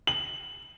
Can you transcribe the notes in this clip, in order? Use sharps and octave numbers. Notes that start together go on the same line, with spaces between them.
F#7